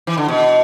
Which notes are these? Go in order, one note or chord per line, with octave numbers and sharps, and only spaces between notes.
E3
D3
B2